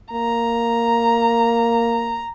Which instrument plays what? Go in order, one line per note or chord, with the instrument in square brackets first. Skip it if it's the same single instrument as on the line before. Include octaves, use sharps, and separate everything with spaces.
[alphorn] A#3 [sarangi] A#5